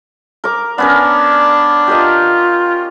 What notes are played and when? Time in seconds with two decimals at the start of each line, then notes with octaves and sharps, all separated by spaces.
0.44 A#4 D6
0.78 B3 C#4 D4 A#4
1.87 F4 G4 A#4 D#5